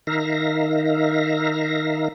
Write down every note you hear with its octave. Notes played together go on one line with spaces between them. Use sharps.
D#3 D#4 E5 F5 A#6